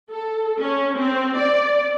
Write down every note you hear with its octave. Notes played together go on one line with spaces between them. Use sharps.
A4
C#4
C4
D5